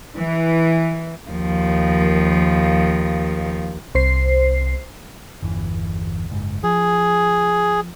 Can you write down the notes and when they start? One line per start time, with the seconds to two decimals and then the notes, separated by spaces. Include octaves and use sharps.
0.16 E3
1.30 D#2 F3
3.95 C2 C5 C7
5.43 G1 E2 E3
6.30 F#1 G#2
6.64 F3 G#4